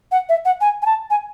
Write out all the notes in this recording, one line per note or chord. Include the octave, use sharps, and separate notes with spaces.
F#5
E5
F#5
G#5
G#5
A5
G#5